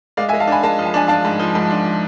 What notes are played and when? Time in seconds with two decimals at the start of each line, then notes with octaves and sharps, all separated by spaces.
0.17 G#3 D5 F5
0.29 E5 G#5
0.33 G#3
0.40 F5 A5
0.48 D4 G#5 B5
0.63 G#3 F5 A5
0.79 F3
0.86 A5
0.94 D4 G#5
1.07 D4 F5 A5
1.25 G#2
1.40 F3
1.55 G#2
1.71 D4